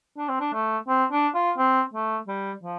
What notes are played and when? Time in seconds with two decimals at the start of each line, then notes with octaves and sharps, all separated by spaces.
0.17 D4
0.28 C4
0.40 D4
0.53 A3
0.88 C4
1.12 D4
1.35 F4
1.58 C4
1.93 A3
2.28 G3
2.63 F3